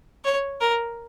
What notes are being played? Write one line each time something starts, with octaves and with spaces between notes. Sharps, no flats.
C#5
A#4